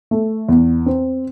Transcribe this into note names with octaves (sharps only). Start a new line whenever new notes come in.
A3
E2
C4